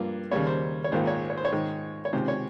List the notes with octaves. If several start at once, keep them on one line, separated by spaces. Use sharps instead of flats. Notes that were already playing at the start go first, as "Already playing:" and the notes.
Already playing: G2 F3 A#3
D#2 C#3 G3 A#3 C#5
C5
C#5
A#1 G#2 D#3 A#3 C5
C#5
C#5
C5
C#5
G#2 D#3 G#3
C#5
C#2 C3 D#3 C5
C#5